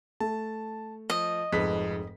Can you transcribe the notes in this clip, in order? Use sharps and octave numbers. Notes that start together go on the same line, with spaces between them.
A3 A5
F3 D#5
F1 F2 G#2 B4 B6